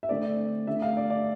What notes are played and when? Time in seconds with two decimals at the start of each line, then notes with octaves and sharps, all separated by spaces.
0.03 E5
0.09 D3 A3 C4 D5
0.67 D3 A3 D4 E5
0.82 F5
0.97 D5
1.10 D5